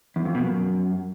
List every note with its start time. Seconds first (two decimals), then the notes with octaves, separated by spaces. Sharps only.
0.16 E2
0.25 F2
0.35 B2
0.44 F#2